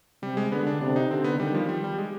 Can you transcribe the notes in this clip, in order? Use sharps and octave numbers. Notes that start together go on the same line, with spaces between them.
C3 G3
G#3
D3 B3
D4
C3 D4
D#4
D3 C4
B3
D#3 G3
F3
G3
G3
G#3